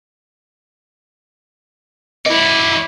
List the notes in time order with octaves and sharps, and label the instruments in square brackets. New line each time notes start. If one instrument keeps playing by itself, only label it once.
[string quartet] E4 [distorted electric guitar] F#4 D5 [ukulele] D#5